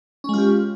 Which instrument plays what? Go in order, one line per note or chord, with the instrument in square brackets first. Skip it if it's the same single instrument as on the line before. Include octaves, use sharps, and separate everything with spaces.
[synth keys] C#4
G#3
F4
G4